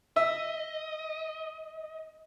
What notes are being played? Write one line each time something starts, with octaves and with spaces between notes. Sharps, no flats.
D#5 E5